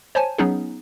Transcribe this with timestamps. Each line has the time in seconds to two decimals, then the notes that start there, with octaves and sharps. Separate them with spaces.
0.15 C5 C#5 G#5 A5
0.38 F#3 B3 C#4 D#4 G#4